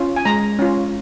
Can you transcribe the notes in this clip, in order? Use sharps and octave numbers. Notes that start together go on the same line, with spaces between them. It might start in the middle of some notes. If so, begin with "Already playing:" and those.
Already playing: C#4 F4
G#5
G#3 A#5
C#4 F4